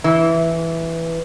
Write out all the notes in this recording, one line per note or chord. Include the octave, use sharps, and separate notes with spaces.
E3